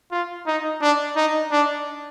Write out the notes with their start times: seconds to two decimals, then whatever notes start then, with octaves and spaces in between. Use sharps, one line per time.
0.12 F4
0.47 D#4
0.82 D4
1.16 D#4
1.52 D4